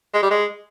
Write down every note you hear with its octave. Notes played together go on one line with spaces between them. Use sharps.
G#3
G3
G#3